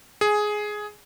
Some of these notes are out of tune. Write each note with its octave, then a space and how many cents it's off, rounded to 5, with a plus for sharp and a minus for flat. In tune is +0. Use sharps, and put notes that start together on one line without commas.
G#4 +10 G#5 +0